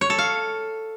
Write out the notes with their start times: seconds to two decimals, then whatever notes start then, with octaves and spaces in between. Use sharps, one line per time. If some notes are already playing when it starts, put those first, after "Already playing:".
0.01 C#5
0.10 A4
0.18 F5